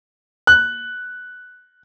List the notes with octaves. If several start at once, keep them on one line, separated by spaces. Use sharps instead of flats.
F#6